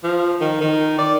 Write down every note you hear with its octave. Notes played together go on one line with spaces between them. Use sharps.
F3
D#3
D#3
D5